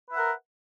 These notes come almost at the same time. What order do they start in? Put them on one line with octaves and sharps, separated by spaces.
B4 E5 F#5 A#4